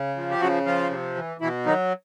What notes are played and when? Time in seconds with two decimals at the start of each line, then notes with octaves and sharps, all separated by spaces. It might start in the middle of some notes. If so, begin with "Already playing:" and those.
Already playing: C#3
0.16 F3
0.31 G4
0.40 C#3 F#3 F#4
0.65 F3 F4
0.91 C3
1.16 E3
1.41 B2 E3 E4
1.66 D#3 F#3 D#4